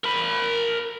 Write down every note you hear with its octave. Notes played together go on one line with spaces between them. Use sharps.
A#4 B5